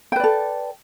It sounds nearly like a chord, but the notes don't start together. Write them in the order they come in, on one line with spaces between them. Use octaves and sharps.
G5 B4 D5 A4